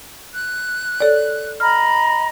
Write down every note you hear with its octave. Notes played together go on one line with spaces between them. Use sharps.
F#6
A4 C#5 D5
D#5 A#5 B5 F6